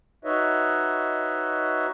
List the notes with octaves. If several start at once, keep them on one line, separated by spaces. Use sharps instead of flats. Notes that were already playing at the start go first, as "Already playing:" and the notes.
D#4 F#4 B4 C#5 D#5 E5